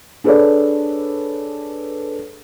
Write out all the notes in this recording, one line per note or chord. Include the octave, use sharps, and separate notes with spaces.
D4 G#4 A4 B4 C#5 D5